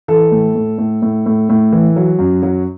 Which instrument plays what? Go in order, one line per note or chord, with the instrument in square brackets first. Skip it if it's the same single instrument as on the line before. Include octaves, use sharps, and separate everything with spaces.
[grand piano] E3 A4
A2
A2
A2
A2
A2
A2
E3
F#3
F#2
F#3